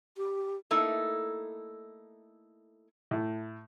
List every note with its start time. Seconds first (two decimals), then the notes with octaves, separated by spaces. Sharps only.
0.17 G4
0.71 A3 A#3 D#4 E4 A4
3.11 A2